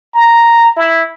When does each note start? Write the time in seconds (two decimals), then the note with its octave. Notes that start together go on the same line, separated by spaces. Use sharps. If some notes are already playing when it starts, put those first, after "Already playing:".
0.14 A#5
0.76 E4